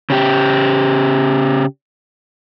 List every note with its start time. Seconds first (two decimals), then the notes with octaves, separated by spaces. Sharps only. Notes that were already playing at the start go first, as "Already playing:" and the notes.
0.10 C#3 G4